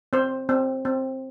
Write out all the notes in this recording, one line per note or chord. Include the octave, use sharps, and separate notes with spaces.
C4 C5
C4
C4